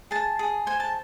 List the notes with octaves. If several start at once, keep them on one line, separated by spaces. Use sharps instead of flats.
G#4 A5
G#4
C5 G#5
A5